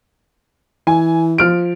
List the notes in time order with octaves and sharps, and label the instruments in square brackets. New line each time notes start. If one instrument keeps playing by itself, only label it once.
[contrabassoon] E3 [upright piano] G#5
[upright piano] F3 F6 D7